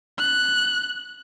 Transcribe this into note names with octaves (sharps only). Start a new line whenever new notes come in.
F#6